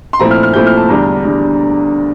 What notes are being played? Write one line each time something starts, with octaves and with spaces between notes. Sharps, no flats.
C6
A#2 F3 A3 C4 E4 A#5
F6
F6
A#2 F3 A3 C4 E4 G6
F6
A5
E2 D3 G3 D4 A#5
E2 D3 G3 D4